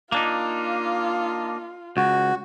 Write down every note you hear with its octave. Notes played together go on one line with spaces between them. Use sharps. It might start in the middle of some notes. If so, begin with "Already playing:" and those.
A#3 D4 D#4 F4
C#2 F#4